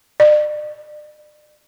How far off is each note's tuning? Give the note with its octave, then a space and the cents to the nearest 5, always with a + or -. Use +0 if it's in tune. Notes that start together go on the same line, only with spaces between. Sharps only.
D5 +40